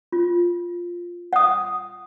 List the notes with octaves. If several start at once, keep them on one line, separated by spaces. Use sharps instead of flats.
F4
F#5 D#6